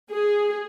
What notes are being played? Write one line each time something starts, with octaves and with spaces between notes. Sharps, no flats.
G#4